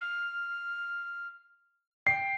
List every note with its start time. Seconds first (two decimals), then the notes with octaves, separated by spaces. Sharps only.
0.01 F6
2.07 G5 C7